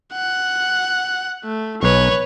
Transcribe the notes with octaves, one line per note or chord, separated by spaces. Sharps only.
F#5
A3
B1 B4 C#5